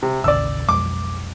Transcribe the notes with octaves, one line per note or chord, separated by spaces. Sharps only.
C3
A1 D#2 C#3 D5 E6
B1 F2 G#3 D6